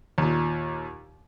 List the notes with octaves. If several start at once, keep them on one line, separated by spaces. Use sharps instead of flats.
D#2 A#2